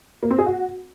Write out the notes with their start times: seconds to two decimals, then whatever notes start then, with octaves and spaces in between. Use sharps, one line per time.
0.23 A#3
0.31 C4
0.38 G#4
0.46 F#4